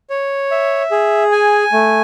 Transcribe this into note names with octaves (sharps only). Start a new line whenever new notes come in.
C#5
E5
G#4
G#5
A3